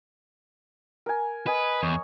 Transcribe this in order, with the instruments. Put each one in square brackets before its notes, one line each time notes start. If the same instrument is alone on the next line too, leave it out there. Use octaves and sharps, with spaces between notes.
[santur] A#4 G#5
[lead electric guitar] B4 [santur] D#5 G#5
[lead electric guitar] E2 [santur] C#5